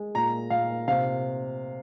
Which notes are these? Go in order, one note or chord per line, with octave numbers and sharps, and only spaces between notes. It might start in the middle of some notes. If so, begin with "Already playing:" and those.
Already playing: G#3
A#2 A#5
A#2 F5
C3 F5